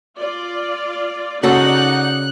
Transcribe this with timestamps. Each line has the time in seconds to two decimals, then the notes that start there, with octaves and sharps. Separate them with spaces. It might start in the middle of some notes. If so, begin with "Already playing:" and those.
0.18 F4 D5
1.43 C#3 D#4 F#4 A4 D5 F#5 F#6